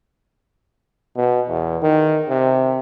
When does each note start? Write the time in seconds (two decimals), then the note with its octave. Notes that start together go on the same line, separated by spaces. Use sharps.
1.16 B2
1.49 E2
1.82 D#3
2.29 C3